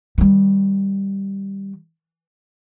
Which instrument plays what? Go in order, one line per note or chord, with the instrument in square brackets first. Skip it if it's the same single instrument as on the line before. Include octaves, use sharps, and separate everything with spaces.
[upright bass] D#3 G3